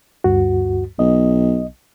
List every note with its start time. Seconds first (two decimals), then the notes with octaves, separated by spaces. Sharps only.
0.24 D2 G2 F#4
0.99 B1 D#5